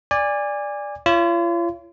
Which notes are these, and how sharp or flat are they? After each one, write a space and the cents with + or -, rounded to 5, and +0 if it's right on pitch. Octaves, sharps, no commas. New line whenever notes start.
D5 +0 G#5 -25
F4 -40 C#5 +20